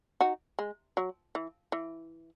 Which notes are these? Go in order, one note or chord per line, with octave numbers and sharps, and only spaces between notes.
D#4 F#4
G#3
F#3
E3
E3